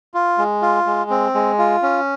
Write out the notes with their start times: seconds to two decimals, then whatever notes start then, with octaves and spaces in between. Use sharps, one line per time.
0.14 F4
0.38 G#3
0.62 F4
0.86 G#3
1.10 C4
1.35 G#3
1.59 F4
1.83 C#4